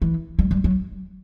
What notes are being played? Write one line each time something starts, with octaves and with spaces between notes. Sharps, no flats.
E3
G3
G3
F#3